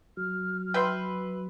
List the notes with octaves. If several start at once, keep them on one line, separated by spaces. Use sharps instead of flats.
F#3 F6
B4 E5 G5 C6